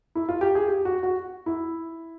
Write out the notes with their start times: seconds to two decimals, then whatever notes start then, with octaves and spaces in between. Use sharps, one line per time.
0.15 E4
0.29 F4
0.41 G4
0.55 G#4
0.68 G4
0.85 F#4
1.03 F#4
1.46 E4